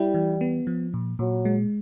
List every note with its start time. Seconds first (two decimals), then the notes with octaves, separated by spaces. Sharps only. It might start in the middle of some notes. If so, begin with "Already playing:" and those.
Already playing: G3 E4
0.14 E3
0.41 B3
0.67 F3
0.94 A#2
1.19 A#2 F#3
1.45 G#3